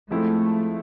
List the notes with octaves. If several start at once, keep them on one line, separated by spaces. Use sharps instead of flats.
F3 G#3 A3 C4 E4